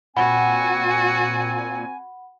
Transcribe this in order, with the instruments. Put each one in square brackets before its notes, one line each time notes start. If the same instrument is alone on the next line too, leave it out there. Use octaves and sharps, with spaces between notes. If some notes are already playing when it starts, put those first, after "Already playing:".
[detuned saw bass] A#2 [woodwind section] C4 G#5 [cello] F#4 [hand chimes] F#5 B5